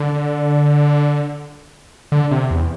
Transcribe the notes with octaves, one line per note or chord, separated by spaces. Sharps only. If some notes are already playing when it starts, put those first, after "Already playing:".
Already playing: D3
D3
C3
E2